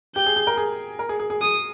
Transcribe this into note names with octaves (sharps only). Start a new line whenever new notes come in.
G4 G6
G#4
G#4
A#4
G#4
A#4
G#4
G#4
G#4
G#4 D#6